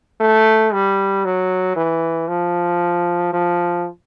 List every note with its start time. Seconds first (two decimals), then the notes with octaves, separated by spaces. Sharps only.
0.20 A3
0.73 G3
1.25 F#3
1.76 E3
2.28 F3
3.33 F3